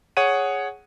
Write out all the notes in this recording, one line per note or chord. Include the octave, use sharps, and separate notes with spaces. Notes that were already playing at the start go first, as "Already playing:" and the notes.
G#4 C#5 F#5 D#7